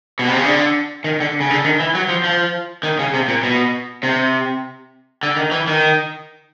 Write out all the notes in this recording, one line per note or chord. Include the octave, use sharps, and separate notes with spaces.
B2
C3
C#3
D3
D#3
D3
C#3
D3
D#3
E3
F#3
F3
F3
D#3
C#3
C3
A#2
B2
C3
D3
D#3
E3
D#3